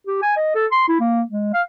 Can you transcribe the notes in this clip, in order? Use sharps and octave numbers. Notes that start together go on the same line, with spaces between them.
G4
G#5
D#5
A4
C6
E4
A#3
G#3
F5